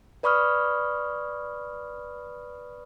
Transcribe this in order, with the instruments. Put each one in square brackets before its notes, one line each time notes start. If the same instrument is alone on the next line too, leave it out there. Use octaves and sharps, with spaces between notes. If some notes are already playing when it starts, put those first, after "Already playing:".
[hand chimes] B4 D5 B5 C#6 D#6 F6